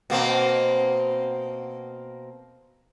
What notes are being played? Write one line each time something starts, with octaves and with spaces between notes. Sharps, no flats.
B2 A#3 C4